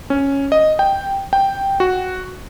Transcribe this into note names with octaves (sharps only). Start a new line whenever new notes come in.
C#4
D#5
G5
G5
F#4